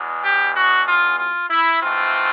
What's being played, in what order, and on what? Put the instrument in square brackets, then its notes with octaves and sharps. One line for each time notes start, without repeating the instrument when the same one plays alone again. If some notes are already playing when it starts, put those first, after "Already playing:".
Already playing: [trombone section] E2 B2 G#3
G4
F#4
F4
F4
E4
G#2 E3 A3 C4 F4